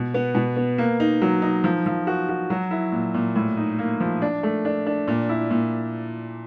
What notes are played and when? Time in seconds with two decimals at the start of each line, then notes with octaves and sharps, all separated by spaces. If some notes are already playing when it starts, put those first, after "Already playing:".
Already playing: B2
0.14 B3
0.35 B2
0.56 B3
0.78 A#3
1.00 D#4
1.22 F#3
1.42 D#4
1.64 F3
1.86 F3
2.07 F#4
2.29 F#4
2.50 F#3
2.71 E4
2.92 A#2
3.14 A#2
3.36 A2
3.57 D#4
3.79 A#3
4.00 F3
4.22 D4
4.43 A3
4.65 D4
4.86 D4
5.08 A#2
5.29 E4
5.51 A#2